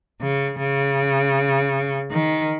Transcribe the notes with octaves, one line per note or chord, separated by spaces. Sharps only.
C#3
C#3
D#3